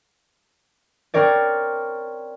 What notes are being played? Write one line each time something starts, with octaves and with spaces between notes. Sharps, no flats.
C4 A#4 C#5 D5